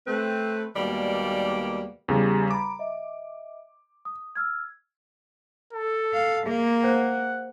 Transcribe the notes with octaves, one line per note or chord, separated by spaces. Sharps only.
A3 C4 B4
D#2 B2 G3 G#3 A#3 D5
E2 C#3 G3 G4 G#4
A#5 B5 D6
D#5 E5
D#6
E6 F6 G#6
A4
F5
A#3 G#4 E5
C5 F#5